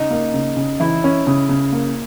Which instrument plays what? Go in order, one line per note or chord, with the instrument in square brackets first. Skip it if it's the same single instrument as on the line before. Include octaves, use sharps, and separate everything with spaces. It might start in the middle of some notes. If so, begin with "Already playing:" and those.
Already playing: [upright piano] C#3 [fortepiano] D#4
[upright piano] A#3
C#3
C#3
[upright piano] E3 [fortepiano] E4
[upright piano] C#4
C#3
C#3
A#3